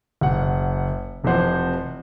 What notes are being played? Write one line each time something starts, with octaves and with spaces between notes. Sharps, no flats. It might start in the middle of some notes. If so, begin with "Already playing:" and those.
F#1 F#5
F1 C3 E3 F3 C5 F#5